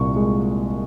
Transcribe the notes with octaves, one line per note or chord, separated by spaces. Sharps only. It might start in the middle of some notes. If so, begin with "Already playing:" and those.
Already playing: C2 A#2 C#6
G#3